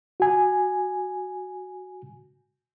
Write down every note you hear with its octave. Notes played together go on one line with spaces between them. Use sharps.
F#4 G#5